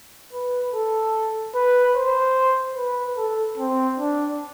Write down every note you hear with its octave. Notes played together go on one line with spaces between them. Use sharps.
B4
A4
B4
C5
B4
A4
C4
D4